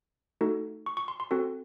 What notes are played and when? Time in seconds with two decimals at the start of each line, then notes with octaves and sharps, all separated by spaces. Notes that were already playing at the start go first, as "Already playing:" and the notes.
0.41 A3 D#4 F#4 A4
0.86 C#6
0.97 C#6
1.08 C6
1.20 C6
1.31 C4 F#4 A4